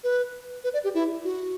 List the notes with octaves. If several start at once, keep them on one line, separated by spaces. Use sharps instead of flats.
B4
B4
D5
G4
E4
F#4